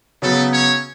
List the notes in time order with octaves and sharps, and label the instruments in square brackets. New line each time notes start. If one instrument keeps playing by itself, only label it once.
[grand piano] C#3 F#3 B3 [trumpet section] A3 A4
[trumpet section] C#4 C#5